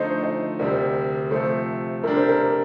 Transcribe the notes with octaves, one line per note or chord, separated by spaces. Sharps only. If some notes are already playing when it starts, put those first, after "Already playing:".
Already playing: D3 F3 A3 D#4 C5 D#5
C5 D#5
D2 C3 G3 A#4 D5
C3 F3 A3 A4 C5
C3 G3 D4 A#4
C5
A#4
C5